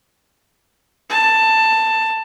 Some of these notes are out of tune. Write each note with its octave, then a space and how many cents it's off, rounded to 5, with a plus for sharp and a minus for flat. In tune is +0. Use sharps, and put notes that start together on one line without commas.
A5 +15